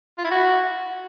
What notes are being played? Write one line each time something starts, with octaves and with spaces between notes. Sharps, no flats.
F4
E4
F#4